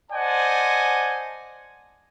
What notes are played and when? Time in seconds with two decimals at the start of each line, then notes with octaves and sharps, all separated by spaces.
0.11 C5 D5 D#5 F#5 G#5 A5